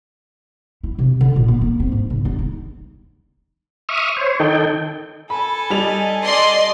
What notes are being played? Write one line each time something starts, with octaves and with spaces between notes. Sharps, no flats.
E4
C3
D3
A#2
A#3
A#3
C4
G#2
C#3
D4
D#4
E5 C#6 D#6 F6
C5 C#5
D#3 D#4 A4 G5
A4 G#5 B5
G3 D#4 F7
D5 D#5 C6